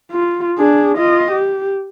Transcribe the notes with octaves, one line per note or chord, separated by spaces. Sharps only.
F4
D4 G#4
F4 D#5
G4